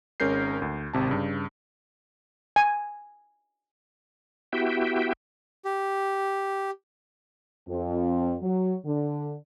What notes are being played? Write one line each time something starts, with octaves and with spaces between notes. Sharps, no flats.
G#1 G#3 C#4 A#4 G6 C7
D2
G#1 C3 A5
G2 C#3
G#5
B3 E4 F#4 G4 E5 G5
G4
F2
F#3
D3